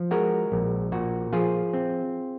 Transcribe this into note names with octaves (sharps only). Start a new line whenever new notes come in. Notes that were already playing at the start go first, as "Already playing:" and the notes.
Already playing: F3
G#3 F#4 A#4
A#1
A#2 F#4
F3 F4 G#4
C4